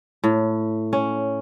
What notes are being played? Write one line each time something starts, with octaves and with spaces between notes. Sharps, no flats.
A2
C#4